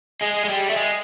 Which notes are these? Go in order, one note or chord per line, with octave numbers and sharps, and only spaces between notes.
G#3
G#3
G3
A3
G#3